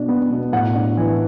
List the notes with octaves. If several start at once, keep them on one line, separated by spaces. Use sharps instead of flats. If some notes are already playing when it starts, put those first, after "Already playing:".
Already playing: B2 D4
B3
B2
A2 F#5
D4
E3